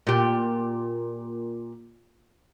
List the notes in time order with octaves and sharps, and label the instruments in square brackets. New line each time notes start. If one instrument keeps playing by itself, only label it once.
[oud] A#2 G4